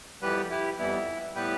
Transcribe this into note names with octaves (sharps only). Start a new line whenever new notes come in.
F2 E3 G3 B3 G4 B4
E4 G4
F2 E3 G3 B3 E4
A2 G3 B3 G4 B4